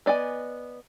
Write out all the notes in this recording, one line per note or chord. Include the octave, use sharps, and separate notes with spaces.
B3 D5 D#5 G#5